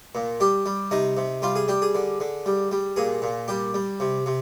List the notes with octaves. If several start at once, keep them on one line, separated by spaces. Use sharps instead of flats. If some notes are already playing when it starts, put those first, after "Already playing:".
A#2
G3 G4
G3
C3 D#4
C3
G3 F4
G#4
G3 G4
G#4
D3
D3
G3
G3
A#2 G#4
A#2
G3 G4
G3
C3
C3